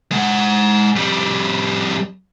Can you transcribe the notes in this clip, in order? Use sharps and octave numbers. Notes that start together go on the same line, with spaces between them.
G#3 F#5
F2 G3